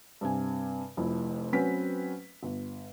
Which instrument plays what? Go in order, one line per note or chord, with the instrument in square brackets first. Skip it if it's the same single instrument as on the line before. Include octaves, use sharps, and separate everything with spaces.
[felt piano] G2 C3 G#5
F1 F2 E4
F#3 C4 C#4 B4 B6
G1